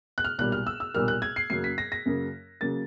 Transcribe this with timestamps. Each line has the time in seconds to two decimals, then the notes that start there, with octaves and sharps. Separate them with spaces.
0.18 F#6
0.24 F6
0.38 B1 A#2 G3 A#3 F#6
0.52 F6
0.67 E6
0.80 E6
0.94 B1 A#2 G3 A#3 F6
1.08 F#6
1.22 G#6
1.36 C7
1.50 F#2 C#3 F#3 A#3 C7
1.64 B6
1.78 A#6
1.92 A#6
2.06 F#2 C#3 F#3 A#3
2.61 C#3 F#3 A#3 A6